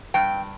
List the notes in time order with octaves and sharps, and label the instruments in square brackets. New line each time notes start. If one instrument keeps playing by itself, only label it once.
[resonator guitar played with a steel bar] G2 G5